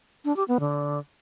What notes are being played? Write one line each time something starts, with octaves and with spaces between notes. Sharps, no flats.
D4
G4
B3
D3